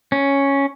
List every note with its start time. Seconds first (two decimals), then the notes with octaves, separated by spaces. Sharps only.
0.12 C#4